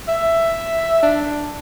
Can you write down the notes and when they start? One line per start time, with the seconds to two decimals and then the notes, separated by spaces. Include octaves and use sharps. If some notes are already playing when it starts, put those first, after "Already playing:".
0.08 E5
1.02 D4